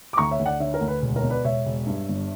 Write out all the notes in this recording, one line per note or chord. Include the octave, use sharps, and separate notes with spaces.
D6
D2 A#5 C#6
C#5 E5
D2
D5 F#5
D3 C#5 E5
A#4 C#5
D2
B4
E1
A#4 C#5
B2
B4 D5
E1 C#5 E5
E1
G2
G1